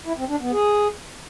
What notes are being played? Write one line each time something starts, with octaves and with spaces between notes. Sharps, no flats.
E4
C4
D4
B3
G#4